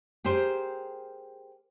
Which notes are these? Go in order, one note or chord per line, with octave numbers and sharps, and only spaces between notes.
G4 G#4 A#4 C5